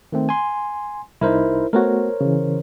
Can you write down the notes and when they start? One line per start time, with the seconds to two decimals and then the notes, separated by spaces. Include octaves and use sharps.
0.12 D#3 A3 C4
0.29 G#5 C6
1.21 C2 D#4 E4 A#4 C5
1.73 A3 B3 F#4 A#4 C5 C#5
2.21 C#3 E3